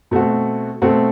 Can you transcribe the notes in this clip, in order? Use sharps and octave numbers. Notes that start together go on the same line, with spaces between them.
B2 A3 C4 F#4
B2 A3 C4 F#4